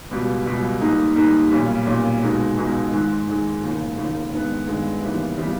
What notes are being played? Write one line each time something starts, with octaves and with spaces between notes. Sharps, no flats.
C#2 B2 G3
C#2 B2 G3
G#2 G3 A#3 D#4
G#2 G3 A#3 D#4
B1 A#2 G3 C#4
B1 A#2 G3 C#4
C#2 B2 G#3 D#4
C#2 B2 G#3 D#4
G#2 D#3 G#3
G#2 D#3 G#3
E1 D#2 C#3
E1 D#2 C#3
G2 D#3 G#3 B3
G2 D#3 G#3 B3
D#2 C#3 E3 G3 B3
C#3 E3 G3 B3